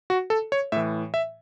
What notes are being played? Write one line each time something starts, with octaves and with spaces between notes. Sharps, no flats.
F#4
A4
C#5
A2 E3 E5
E5